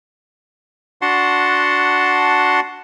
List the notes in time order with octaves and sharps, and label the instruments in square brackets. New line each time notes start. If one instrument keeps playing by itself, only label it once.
[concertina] D4 F#4 F#5 A5 C6